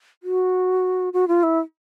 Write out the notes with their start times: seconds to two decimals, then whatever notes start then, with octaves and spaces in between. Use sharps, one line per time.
0.23 F#4
1.13 F#4
1.28 F4
1.43 E4